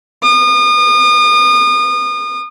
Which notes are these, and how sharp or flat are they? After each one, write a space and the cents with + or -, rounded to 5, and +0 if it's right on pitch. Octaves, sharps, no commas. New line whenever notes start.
D#6 -35